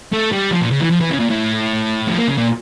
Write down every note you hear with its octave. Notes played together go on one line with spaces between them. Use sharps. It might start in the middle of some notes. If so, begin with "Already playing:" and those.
A3
G3
F3
A#2
C#3
E3
F3
E3
C#3
A#2
A2
F3
A#3
C#3
A#2